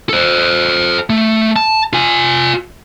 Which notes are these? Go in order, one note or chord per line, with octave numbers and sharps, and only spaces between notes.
A4 C5
A3
A5
F4 G#5